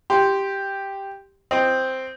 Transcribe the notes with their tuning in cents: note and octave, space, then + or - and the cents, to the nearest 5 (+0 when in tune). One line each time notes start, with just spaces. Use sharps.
G4 +0 C6 -5
C4 +0 D#5 +0